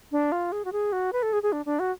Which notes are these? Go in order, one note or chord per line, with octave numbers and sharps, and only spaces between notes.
D4
F4
G#4
F#4
G#4
F#4
B4
A4
G#4
G#4
D4
D4
F#4